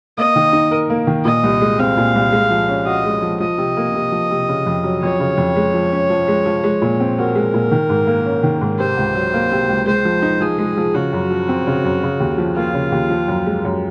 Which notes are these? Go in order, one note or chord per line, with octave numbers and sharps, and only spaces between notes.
A#3 D#5
D#3
D#4
A#4
A#3
D#3
A#2 D#5
C2
G#3
C4 F5
A#2
C2
G#3
F3
C#4
F#4 D#5
G#3
F3
F3 D#5
C3
A#3
C3
F3
C3
C#3
F2
F#3
F2 C#5
C#3
F2
G#3
F3
C#4
F3
G#3
F3
G#3
A#2
C4
F#4 A#4
G#3
A#2
D#3
G#2
A#3
C#4
D#3
G#2
C3 C5
C#2
F#3
A#3
C3
C#2
G#3 C5
F3
D#4
F3 G#4
G#3
F3
C#3 F#4
F#2
F3
C4
C#3
F#2
C#3
D#2
F3
A#3 F4
C#3
D#2
F3
F#2
G#3
F#2